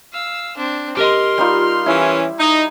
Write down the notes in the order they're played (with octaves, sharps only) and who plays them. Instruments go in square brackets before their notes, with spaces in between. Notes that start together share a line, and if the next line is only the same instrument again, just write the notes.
[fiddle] F5 E6
C4 D4
[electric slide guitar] G4 A#4 D#5 [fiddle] C6 F6
[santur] G3 D#4 F4
[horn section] E3 C#4 [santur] E4
[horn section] D#4